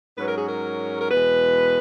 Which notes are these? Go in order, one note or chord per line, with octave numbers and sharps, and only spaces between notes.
G#2 F#3 C#4 B4
A#4
G#4
A#4
A#4
E2 B2 G#3 B4